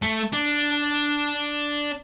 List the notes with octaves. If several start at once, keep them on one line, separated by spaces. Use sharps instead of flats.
A3
D4